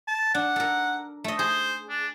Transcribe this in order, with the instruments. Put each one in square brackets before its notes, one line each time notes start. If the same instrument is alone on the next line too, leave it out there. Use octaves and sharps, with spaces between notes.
[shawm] A5
[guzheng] D4 [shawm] F#5
[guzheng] A4 A#4
A3 D#5
[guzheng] G#4 [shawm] C5
[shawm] D4